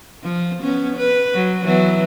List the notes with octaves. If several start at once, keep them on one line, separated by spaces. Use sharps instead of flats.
F3
B3 C#4
B4
F#3
E3 F#3 B3